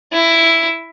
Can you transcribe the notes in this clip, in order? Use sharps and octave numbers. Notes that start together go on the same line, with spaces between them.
E4